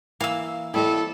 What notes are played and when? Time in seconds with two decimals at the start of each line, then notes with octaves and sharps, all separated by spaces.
0.21 E3 A#3 F5 E6
0.74 G3 C4 E4 A4 C#5 D#5